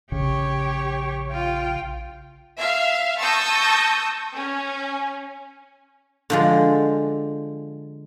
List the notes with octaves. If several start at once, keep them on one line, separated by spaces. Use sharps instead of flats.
A#1 C#3 G4 C#5
F4 G5
E5 F5
A5 C#6 D#6 E6 G6 A#6
C#4
D3 F3 G#3